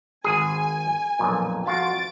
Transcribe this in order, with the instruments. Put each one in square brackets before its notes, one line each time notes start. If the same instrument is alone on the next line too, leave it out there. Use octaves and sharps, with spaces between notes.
[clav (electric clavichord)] G#1 G#4 [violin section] G#5
[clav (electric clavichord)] B1 F2 A#2
[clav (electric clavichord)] F2 F4 F#4 [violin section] A6 D7